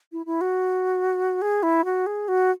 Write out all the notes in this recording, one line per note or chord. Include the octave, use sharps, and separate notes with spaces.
E4
E4
F#4
G#4
E4
F#4
G#4
F#4